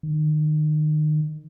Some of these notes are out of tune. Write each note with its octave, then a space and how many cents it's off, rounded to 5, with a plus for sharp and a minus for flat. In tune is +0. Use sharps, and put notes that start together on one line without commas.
D#3 -30